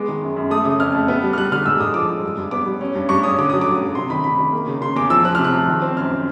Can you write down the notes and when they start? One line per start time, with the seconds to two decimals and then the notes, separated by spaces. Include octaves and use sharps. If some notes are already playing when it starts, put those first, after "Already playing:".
Already playing: G#3 B3 D6
0.08 D#3
0.22 F#2
0.36 F#2
0.50 A3 D#6
0.65 C#3 D#6
0.80 F2 F6
0.95 A3
1.08 B3
1.23 G3
1.33 F6
1.37 G3 F#6
1.52 D3 F6
1.66 G#2 E6
1.80 G#2 D#6
1.94 F3 D6
2.09 F3
2.23 G2
2.37 G2
2.51 B3 D6
2.66 G3
2.81 C#4
2.95 G2
3.09 G2 C#6
3.23 C#4 D#6
3.38 D3 D6
3.50 F#3 D#6
3.61 D6
3.67 G2
3.81 F#3
3.95 C3 C6
4.10 D#3 B5
4.24 C3 B5
4.38 D#3
4.53 A#3
4.67 C#3
4.81 C#3 C6
4.96 E2 D6
5.10 F3 E6
5.24 F3 F#6
5.35 C3 F6
5.44 F#6
5.53 F3
5.67 D#3
5.82 C4
5.97 F#2 F6
6.11 C4